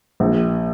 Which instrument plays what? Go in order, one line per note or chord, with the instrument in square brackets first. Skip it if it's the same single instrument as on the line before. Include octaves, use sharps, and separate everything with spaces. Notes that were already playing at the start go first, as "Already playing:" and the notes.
[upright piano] A#1